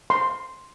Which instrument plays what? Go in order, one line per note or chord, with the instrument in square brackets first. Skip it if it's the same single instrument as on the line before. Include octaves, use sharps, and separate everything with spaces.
[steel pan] C6